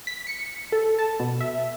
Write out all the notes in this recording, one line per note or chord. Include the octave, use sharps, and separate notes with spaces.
B6
C#7
A4
A5
B2
E5